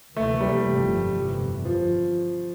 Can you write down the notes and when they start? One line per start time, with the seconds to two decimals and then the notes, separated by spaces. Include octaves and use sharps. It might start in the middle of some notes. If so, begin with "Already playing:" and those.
0.17 D2 C3 E3 A3 A#3
0.41 G3
0.65 G1 F2 C3 F3 A3
1.15 G1 F2 C3 E3
1.65 F3